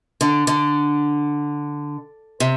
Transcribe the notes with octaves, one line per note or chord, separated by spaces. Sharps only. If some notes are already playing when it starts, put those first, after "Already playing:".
D3
D3
C3